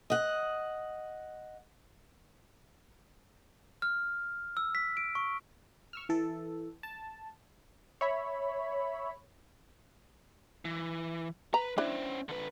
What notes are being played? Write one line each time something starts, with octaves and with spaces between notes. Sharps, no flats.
D#5 F#5
F6
E6
B6
D7
C#6
C#6 E6 F6
E3 A4
A5
C#5 E5 B5
E3
B4 A#5
C#4 D4 E4 C5
D3 B4